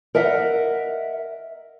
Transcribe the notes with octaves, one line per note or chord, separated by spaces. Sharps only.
A#4 D#5 E5 F#5